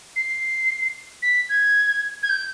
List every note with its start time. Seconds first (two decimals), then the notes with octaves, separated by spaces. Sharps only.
0.16 C7
1.22 B6
1.49 G#6
2.22 G#6
2.29 G6